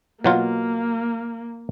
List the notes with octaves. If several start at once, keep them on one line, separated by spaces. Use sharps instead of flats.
B2 F#3 A#3 F4